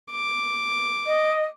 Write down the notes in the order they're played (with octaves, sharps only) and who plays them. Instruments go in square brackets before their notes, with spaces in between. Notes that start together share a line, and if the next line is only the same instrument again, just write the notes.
[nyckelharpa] D6
[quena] D#5